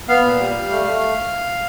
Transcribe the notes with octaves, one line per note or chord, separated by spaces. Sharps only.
B3 F5
A#2
G3
G3
A3
A3